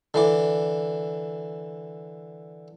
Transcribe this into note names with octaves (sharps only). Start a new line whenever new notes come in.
D3 E3 D6